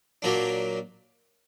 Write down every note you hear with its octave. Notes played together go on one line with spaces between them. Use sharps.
A#2 F#3 A#3 D4